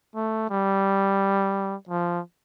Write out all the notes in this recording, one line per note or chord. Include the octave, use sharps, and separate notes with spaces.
A3
G3
F3